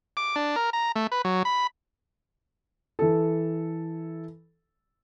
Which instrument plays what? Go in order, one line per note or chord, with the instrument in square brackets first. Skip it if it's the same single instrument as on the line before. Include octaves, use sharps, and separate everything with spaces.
[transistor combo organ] D6
D4
A#4
A#5
A3
B4
F#3
B5
[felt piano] E3 A4